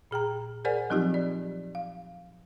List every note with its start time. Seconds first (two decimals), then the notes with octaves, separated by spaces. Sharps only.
0.11 A#2 G#4 G5 A#5
0.65 G#4 A#4 C5 D5 F#5 G#5
0.90 F3 F#3 C4 D#4 F4 G4
1.14 D5
1.75 F5